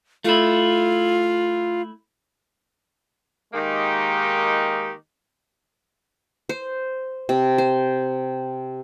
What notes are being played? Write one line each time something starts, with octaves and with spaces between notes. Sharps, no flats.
A3 E4 F4
D#3 G#3 A#3 D#4 G4
C5
C3
C5